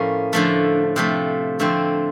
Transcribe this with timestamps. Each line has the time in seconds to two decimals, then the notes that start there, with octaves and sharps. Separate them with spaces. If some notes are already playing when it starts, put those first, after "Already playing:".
Already playing: A2 F3 A#3 C#4
0.33 D3 F3 A3
0.96 C3 F3 A3
1.60 D3 F3 A3 C4